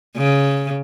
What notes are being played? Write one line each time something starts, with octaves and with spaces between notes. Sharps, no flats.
C#3